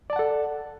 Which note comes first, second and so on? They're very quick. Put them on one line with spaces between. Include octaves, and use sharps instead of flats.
D5 A5 F#5 A4